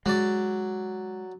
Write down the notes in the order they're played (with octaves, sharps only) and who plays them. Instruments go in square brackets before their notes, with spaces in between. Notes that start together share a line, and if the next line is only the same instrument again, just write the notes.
[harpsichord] F#3 D5 [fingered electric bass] G#3